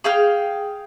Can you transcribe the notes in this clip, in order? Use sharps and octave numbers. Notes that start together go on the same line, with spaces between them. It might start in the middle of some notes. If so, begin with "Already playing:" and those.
G#4 F5 G5 F6